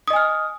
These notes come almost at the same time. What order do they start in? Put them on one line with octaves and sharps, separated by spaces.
D#6 D#5 G#5 F6